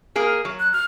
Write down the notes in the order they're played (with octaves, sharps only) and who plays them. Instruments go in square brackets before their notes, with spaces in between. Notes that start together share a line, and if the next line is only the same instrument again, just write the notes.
[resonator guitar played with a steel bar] A#3 G#4 A#4
F#3
[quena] F#6
F6